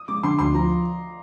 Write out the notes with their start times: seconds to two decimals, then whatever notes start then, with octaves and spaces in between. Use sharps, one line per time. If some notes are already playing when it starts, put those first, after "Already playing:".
Already playing: D#6
0.08 G#3 D6
0.23 D3 C6
0.39 D2 C6
0.54 F3 A#5